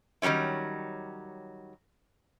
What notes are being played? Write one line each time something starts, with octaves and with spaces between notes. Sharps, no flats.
D#3 F#3 G3 C#4 E4